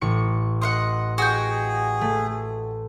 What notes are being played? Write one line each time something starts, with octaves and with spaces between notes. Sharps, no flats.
A1 C#6 C#7
D#5 F5 F#5 C6
F#4 G#4 D#5 G5
A3